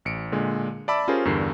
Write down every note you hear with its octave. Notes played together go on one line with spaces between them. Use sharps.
A1 C#7 D7
A#2 D3 G#3
D5 E5 A5 B5 D6 E6
C#4 F4 G4 G#4 A#4 C5
E2 G2 D3 A#4 C7